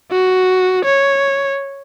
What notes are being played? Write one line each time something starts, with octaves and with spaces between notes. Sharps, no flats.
F#4
C#5